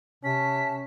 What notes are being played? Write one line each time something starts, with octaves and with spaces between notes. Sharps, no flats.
C3 C#4 A5 B6